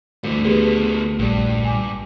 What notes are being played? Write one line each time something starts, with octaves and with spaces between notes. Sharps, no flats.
D2 G2 E3
D3 B3 G4 G#4 B4
A#1 G2 G3
G#5 D6